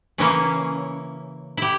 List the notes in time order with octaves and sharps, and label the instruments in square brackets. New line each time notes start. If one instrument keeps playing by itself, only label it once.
[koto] C#3 E3 A#3 C#4 E4
E4 G4